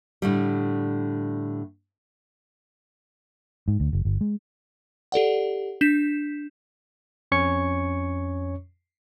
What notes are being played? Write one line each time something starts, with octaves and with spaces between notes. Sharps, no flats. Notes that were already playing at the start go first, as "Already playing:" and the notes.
A2 D3 G3
G#2
D2
F#1
G1
G#3
G4 A4 D5 F#5
D4 G6 B6 E7
F2 C#4 C#5 C#6 C#7